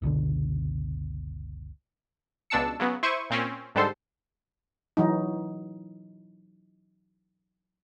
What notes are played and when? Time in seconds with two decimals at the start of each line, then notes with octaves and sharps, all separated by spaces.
0.02 F#1 C#2 B2 D3
2.50 C#2 B2 D4 A5 E6 C#7
2.80 C#3 F#3 B3
3.03 E4 C5 C#6 D#7
3.30 A#2 C4 C#4
3.75 G#2 D3 G3 A4 C5 C6
4.97 E3 F#3 D#4